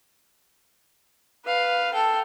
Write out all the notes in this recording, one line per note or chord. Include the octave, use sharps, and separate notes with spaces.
B4 F5
A4 G5